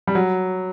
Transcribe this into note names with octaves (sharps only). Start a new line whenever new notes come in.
G3
F#3